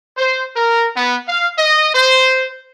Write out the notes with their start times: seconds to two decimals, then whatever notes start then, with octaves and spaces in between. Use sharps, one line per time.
0.17 C5
0.56 A#4
0.96 B3
1.29 F5
1.59 D#5
1.95 C5